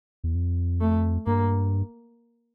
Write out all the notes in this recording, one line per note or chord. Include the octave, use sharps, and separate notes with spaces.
E2
F2
A3
G2 A#3